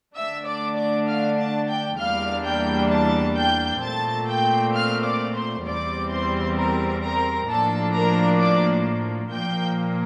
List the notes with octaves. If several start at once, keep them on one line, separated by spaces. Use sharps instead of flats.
D3 A3 D4 E5 E6
D5 D6
D5 D6
F5 F6
A5 A6
G5 G6
E2 E3 G3 A#3 D4 F5 F6
G5 G6
A5 A6
G5 G6
A#2 A3 C4 A5 A6
G5 G6
F5 F6
D5 D6
C5 C6
E2 E3 G3 C4 D5 D6
C5 C6
A#4 A#5
A#4 A#5
A2 F3 A#3 D4 A4 A5
A#4 A#5
D5 D6
A#2 F3 A#3 G5 G6